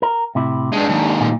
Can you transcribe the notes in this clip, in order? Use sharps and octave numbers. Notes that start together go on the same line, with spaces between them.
A#4
A2 C3 E4
G2 G#3 D4
D#2 G#2
A#2